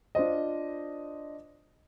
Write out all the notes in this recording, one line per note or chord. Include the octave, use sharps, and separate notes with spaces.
D4 F4 C5 D#5